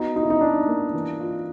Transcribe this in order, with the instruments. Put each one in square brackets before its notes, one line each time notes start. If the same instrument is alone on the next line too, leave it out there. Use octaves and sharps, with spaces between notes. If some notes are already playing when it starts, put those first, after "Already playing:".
Already playing: [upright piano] B3 F#4 [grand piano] D#4
[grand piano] D#4 [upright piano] F#4
[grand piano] E4
D#4
[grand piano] D4 [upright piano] D#4
[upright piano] A#3
E3
F4